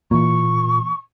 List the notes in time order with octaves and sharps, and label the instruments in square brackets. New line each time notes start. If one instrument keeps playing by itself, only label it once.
[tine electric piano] A#2 [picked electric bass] E3 A#3 [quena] C#6